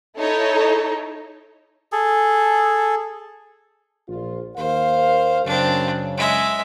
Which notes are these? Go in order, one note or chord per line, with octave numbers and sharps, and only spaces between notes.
D#4 E4 A4 C#5
G#4 A4
A#1 F4
D#2 A#4 C5 F5
F#2 C#3 C4 D4
G#3 E5